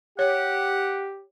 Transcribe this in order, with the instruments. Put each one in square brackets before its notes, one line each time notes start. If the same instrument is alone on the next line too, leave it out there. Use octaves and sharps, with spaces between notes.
[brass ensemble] G4 [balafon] C#5 [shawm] F#5